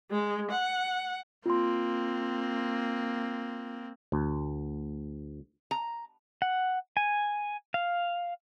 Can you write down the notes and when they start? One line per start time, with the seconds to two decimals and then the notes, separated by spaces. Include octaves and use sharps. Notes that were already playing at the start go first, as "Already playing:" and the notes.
0.11 G#3
0.51 F#5
1.46 A#3 C4 F4 C6
4.12 D2
5.71 A#5
6.42 F#5
6.97 G#5
7.74 F5